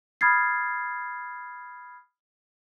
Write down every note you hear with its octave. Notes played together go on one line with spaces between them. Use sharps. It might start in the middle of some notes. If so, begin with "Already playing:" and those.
B5 D#6 F6 G#6 A6 C7